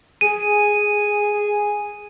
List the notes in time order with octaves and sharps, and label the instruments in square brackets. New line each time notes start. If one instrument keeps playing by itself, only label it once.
[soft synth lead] G#4 [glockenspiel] D#7